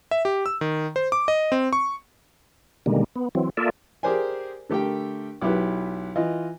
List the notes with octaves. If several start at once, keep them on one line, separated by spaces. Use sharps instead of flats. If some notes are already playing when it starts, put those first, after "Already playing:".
E5
G4
E6
D#3
C5
D6
D#5
C4
C#6
B2 D3 D#3 G3 G#3 A#3
B3
E3 F#3 C4
A#3 F4 A4 D5 E5
G4 G#4 A#4 C5 D5 G#5
D3 A3 G4 A#4 G5
B1 E4 G4 B4
E3 F4 D#5